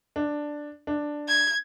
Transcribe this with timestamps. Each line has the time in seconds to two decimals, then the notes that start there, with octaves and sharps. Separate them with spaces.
0.16 D4
0.87 D4
1.28 G#6